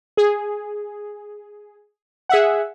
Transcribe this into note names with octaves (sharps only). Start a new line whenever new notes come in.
G#4
G#4 E5 F#5